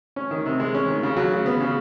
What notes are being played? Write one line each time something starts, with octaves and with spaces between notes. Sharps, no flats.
C#4
D#3
C3
G#3
C#4
D#3
C#3
F#3
C#3
B3
C#3